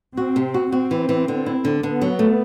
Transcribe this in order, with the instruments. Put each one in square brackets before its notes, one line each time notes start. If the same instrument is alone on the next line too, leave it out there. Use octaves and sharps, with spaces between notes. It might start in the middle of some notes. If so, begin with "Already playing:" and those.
[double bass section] C4 [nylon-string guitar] F#4
[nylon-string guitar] C3
F#4
[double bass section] C4 [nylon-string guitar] F#4
[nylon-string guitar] E3
E3
D3
E4
D3
[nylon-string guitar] D3 [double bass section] B3
[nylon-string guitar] F#3
A3